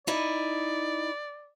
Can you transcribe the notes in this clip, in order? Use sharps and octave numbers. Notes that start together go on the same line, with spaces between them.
D#4 E4 D5 D#5